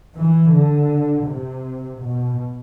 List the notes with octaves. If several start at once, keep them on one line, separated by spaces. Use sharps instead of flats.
E3
D3
C3
B2